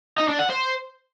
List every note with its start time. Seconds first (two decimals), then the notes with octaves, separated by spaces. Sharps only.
0.18 D#4
0.29 D4
0.39 F#5
0.50 C5